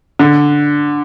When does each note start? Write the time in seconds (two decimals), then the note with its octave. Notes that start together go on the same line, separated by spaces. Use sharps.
0.19 D3